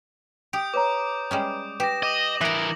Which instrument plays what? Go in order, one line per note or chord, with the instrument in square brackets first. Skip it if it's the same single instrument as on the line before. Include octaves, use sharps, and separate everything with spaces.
[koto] G4 [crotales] D#6 G6 D7
[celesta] B4 C#5 A#5 [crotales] D6
[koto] G3 G#3 C#4
[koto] G4 [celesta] B4 [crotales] A#6 E7
[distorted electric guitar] D#5 [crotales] D6 D#6 F#7
[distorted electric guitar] E3 A#4 [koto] B4 A#5 [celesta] E5